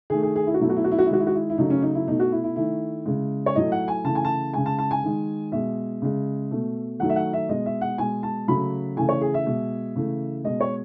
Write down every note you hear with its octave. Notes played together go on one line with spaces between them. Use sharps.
D#3 A3 G#4
G#4
G#4
E4
F#4
B2 F#3 A3 E4
F#4
E4
F#4
E4
F#4
E4
D#3 G#3 F#4
E4
F#4
E4
E4
C#3 F#3 A3 D#4
C#4
D#4
E4
B2 A3 D#4
F#4
E4
E4
D#3 A3 E4
C#3 G#3
C#5
A2 F#3 A3 D#5
F#5
G#5
C#3 E3 A3 A5
G#5
A5
C#3 G#3 G#5
A5
A5
G#5
D#3 G#3
B2 G#3 E5
C#3 G#3
B2 A3
D#3 F#3 A3 F#5
E5
F#5
E5
B2 G#3 D#5
E5
F#5
B2 G#3 G#5
A5
C#3 F#3 A3 B5
C#3 E3 A3 G#5
C#5
G#4
E5
B2 G#3
C#3 E3 A3
B2 G#3 D#5
C#5